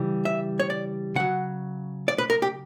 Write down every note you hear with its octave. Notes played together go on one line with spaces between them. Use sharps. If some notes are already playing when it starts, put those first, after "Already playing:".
Already playing: C#3 E3 G3
E5
C#5
D5
C#3 F#3 F#5
D5
B4
A#4
G4